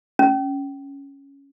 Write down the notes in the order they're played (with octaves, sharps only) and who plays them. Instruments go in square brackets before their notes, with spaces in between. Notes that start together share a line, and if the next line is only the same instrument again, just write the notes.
[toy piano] C#4